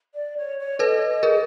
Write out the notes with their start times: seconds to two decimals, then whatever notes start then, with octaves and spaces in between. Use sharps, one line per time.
0.14 D5
0.36 C#5
0.58 C#5
0.79 A4 B4 D#5
1.23 G#4 A#4